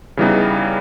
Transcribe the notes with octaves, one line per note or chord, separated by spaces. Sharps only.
C#3 E3 G3 B3 D#4